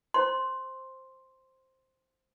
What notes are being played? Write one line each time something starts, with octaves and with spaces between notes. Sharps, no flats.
C5 C6